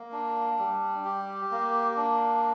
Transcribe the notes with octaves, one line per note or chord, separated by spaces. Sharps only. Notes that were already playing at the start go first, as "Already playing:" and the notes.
Already playing: A#3
D4
G3
G4
A#3
D4